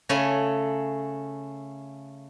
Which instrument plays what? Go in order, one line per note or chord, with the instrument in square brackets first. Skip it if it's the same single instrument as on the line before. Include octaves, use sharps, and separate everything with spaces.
[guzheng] C#3 A3 A4 G#5